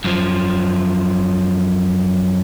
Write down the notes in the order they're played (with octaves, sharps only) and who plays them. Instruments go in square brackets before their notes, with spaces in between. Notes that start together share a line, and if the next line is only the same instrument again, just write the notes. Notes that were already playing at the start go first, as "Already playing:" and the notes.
[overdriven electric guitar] F#2 F3